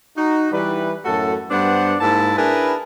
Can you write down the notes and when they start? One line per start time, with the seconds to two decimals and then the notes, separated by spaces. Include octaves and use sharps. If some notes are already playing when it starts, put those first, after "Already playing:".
0.17 D#4 F#4
0.52 E3 G3 B4
1.05 F#2 A2 F#4 A4
1.50 G2 G3 B3 D4 C5 F#5
2.00 G#2 A#3 E4 A5
2.37 D4 E4 G#4 A#4 B4